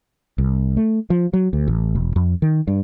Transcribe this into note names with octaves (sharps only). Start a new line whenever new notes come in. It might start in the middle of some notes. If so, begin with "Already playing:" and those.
C2
A3
F3
F#3
D2
A1
E1
F2
D#3
G2